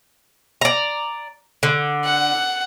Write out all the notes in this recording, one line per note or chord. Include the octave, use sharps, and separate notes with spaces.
D5 A#5
D3
F#5